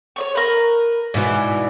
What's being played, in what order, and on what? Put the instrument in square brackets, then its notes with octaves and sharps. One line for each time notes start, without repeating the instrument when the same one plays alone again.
[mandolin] C#5 D5 C#6
A#4 B4
[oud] G#2 B2 E3 [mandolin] D5